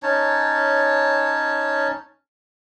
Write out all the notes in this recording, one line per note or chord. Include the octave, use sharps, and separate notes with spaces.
C#4 D#4 C#5 A5